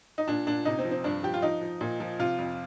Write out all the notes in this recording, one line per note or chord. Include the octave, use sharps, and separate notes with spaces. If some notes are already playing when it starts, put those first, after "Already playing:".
D#4
A#2 D4
A#2 D4
C3 D#4
C4
F3
C4
G2 D4
F3 G4
F4
F3 D#4
F3
A#2
F3
C3 F4
F2